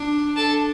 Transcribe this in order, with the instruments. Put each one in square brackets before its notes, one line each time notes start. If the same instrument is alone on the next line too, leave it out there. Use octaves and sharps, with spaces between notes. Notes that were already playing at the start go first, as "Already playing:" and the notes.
Already playing: [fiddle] D4
[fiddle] D4 [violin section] A4 A5